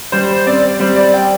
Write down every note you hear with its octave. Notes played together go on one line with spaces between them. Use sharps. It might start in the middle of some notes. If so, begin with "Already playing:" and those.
G3 C5
C4 D5
G3 C5
D5
G5